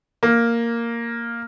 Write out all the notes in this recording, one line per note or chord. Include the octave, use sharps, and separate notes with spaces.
A#3